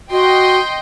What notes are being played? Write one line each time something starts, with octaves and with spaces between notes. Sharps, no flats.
F#4 D#5 G5 C6